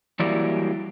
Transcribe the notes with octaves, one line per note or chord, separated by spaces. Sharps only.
E3 F#3 G3 A#3 E4 D5